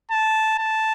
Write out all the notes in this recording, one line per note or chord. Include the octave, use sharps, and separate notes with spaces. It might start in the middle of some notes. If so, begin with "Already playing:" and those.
A5
A5